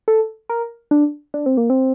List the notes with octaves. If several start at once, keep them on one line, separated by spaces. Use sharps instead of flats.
A4
A#4
D4
D4
C4
A#3
C4